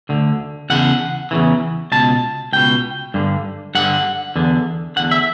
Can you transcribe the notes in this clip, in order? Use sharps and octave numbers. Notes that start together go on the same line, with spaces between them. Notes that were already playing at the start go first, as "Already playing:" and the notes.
D2 D3
E2 C#3 F#5
E2 C#3 E3
C#2 B2 A5
C#2 B2 G5
G2 D3
G2 D3 F#5
E2 D3
E2 D3 F#5
E5